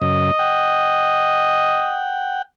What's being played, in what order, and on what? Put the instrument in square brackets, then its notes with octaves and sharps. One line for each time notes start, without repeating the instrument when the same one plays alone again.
[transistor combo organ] F#2 C#3 [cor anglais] D#5
[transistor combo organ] F#5 G5